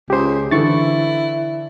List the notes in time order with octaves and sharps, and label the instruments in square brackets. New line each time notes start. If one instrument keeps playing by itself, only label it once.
[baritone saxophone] C#2 [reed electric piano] G4 C5
[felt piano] D3 E3 A4 [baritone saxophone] E4 [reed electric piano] C#6 A6